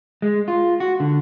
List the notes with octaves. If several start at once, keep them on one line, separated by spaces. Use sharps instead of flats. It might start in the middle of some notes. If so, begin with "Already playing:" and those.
G#3
F4
F#4
D3